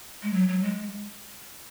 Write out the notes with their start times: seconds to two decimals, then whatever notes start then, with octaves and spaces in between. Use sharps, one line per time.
0.23 G#3
0.33 F#3
0.48 F#3
0.63 G#3